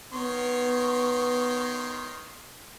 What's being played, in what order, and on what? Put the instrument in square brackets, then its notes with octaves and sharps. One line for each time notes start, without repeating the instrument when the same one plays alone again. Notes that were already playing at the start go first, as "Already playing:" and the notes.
[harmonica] D#3 C#5 C6 [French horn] B3